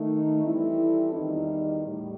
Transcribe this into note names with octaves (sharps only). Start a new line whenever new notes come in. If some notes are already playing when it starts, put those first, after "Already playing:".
Already playing: D#3 A3 D#4
E3 G3 C4 E4 A4
E2 D#3 G3 D#4
A2 G3